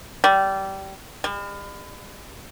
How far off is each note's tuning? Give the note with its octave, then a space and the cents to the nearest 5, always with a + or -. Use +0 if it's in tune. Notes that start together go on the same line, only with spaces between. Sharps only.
G3 -20
G3 +45